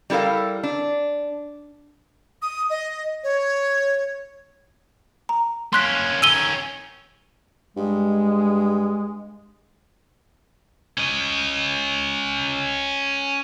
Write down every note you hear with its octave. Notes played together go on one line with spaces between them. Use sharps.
G3 E4 A4 A#4 F5
D4
D#6
D#5
C#5
A#5
A#3 C#4 C6 F#6 B6
D#3 C#4 E6 D#7 G7
G2 G#3
C#4 D#5